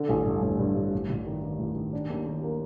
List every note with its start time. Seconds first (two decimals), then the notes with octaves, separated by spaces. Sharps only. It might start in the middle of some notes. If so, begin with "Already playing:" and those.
Already playing: D3
0.09 A1
0.26 G2
0.42 A1
0.59 G2
0.76 A1
0.93 A1
1.09 A1
1.26 D#3
1.43 D#3
1.59 A1
1.76 D#3
1.93 D4
2.10 D#2
2.27 D#2
2.44 A#3